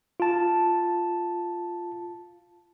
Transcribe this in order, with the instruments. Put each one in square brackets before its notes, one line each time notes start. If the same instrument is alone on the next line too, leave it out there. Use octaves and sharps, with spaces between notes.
[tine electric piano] F4 A5